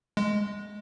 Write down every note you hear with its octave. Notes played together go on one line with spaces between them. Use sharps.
G#3